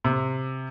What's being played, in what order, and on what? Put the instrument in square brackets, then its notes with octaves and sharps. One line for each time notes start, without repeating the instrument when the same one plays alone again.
[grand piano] C3